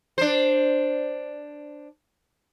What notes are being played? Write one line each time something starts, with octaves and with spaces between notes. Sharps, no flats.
D4 C5